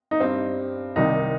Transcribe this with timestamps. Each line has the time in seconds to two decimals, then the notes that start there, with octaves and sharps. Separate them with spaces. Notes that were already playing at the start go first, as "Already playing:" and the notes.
0.11 D#4
0.20 G2 G3 C4
0.96 C2 C3 D#3 G3 D#4